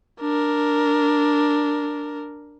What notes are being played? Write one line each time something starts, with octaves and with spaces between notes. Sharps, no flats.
D4 A#4